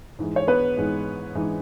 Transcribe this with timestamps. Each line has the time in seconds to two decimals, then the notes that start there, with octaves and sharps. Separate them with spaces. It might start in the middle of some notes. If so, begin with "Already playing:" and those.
0.19 G#2 E3 G#3
0.36 C#5
0.47 B3 B4
0.77 G#2 E3 G#3
1.35 G#2 E3 G#3